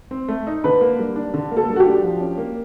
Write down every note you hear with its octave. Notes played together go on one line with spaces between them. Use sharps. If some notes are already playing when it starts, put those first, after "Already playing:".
C4
A3
D#4
D3 B4
A#3
G3
D4
D3
A#3
A4
G3
F#4
G4
D4
F3
C#4
A#3